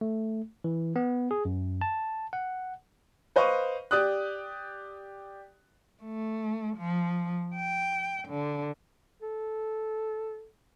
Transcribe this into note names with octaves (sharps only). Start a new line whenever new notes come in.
A3
E3
B3
G#4
F#2
A5
F#5
B4 C5 D#5 F5 C#6
G4 D5 D#6 F#6
A3
F3
G5
D3
A4